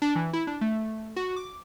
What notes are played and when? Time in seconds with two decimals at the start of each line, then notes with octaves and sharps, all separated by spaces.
0.02 D4
0.15 E3
0.33 E4
0.47 D4
0.61 A3
1.16 F#4
1.36 D6